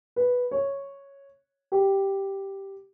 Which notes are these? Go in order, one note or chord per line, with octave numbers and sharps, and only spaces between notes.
B4
C#5
G4